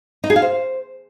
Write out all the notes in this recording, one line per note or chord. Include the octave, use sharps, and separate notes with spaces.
D#4
G#4
F5
C5